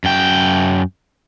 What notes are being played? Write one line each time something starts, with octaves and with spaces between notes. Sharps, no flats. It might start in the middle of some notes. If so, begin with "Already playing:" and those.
F#2 G5